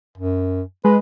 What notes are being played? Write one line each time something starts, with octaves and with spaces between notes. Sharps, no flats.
F#2
G#3 B4